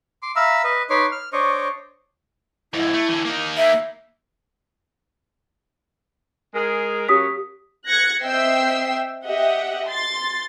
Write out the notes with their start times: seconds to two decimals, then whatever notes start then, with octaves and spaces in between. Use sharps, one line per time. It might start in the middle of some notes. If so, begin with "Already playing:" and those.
0.22 C6 D6
0.36 E5 F5 A#5 B5 E6
0.64 B4 D#5
0.90 D#4 B4 C#5 C6 D6
1.12 F6
1.33 D4 C5 C#5 D#5 C#6 D6
2.74 F2 G#2 E4
2.93 A3
3.08 D3 E3
3.25 A#3 D#4
3.57 E5
6.54 G#3 G#4 A#4
7.09 F#3 A#3 C#4 G4 D#6 B6
7.86 F#6 G#6 A#6 C#7
8.23 C4 D#5 E5 G5 E6 C7
9.26 G4 D#5 E5 F#5
9.88 C6 A6